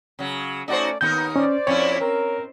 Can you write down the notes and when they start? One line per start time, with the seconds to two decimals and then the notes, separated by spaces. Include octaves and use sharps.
0.19 C#3 F#3
0.68 A3 C#4 D#4 F#4 C5 D5
1.01 D#2 B3 D#4 A#4 G6
1.36 C#4 C5 D5
1.67 F2 C#4 E4 C#5
2.00 C4 A#4